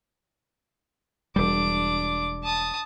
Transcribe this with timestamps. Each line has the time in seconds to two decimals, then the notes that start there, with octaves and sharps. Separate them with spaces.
1.36 E1 G3 D4 D6
2.43 A5 D#6